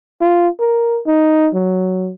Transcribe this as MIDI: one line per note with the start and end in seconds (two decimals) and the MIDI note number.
0.21 0.48 65
0.60 0.99 70
1.07 1.49 63
1.54 2.12 54